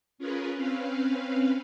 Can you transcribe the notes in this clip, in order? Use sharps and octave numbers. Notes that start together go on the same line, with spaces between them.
C#4 F4 G#4 A#4 B4
C4 C#4 B4 F5